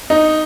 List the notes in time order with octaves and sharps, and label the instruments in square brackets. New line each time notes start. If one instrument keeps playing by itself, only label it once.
[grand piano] D#4